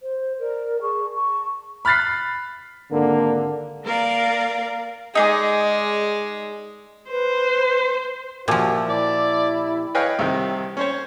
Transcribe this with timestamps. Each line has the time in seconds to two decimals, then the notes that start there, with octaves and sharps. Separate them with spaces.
0.02 C5
0.40 A#4 D5
0.81 G#4 A5 C#6
1.15 A5 C#6
1.85 B5 F6 F#6 A6 B6 C7
2.92 G#1 D3 A#3
3.84 A#3 A#4 D5 F5
5.15 G#3 D#4 G#4 D5
7.11 B4 C5
8.48 A#2 F3 F#4 G4 E5 A5
8.89 E4 D5
9.95 B4 C#5 D#5 F5 G5 G#5
10.19 C2 C3 D#3
10.77 C#4 C5 C#5